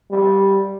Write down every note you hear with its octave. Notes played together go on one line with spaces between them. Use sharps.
G3